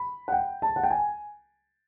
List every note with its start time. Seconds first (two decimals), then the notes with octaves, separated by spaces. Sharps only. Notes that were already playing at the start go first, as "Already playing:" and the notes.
Already playing: B5
0.28 F#5
0.32 G5
0.62 A5
0.76 F#5
0.83 G5
0.91 G#5